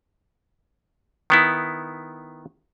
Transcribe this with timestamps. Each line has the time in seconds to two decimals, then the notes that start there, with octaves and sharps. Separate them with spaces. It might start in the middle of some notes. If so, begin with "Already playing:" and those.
1.30 D#3 B3 E4